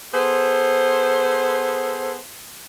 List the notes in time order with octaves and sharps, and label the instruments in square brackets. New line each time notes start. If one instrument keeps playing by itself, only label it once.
[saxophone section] B3 G#4 A4 C5